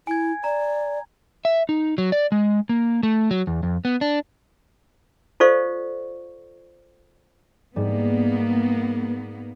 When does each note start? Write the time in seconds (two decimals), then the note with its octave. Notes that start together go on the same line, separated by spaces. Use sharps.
0.07 E4 G#5 G#6
0.44 D5 A#5
1.45 E5
1.69 D#4
1.98 F#3
2.12 D5
2.32 G#3
2.69 A#3
3.03 A3
3.31 F#3
3.47 E2
3.63 F2
3.85 B3
4.01 D4
5.40 F4 A4 C5 D5 F5 C#6
7.76 G#2 G3 A#3 B3